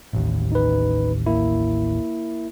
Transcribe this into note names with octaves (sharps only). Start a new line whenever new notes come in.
A1 D#2
D#4 B4
A#3 E4